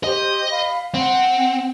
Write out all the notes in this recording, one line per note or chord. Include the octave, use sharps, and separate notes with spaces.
G4 C5 D#5 C6
F5 B5
C4 F#5